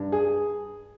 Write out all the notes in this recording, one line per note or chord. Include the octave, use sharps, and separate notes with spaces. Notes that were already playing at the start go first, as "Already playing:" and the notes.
Already playing: G2
G#4